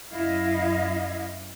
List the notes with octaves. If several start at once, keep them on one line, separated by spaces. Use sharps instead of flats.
F#2 E4 D#5 F5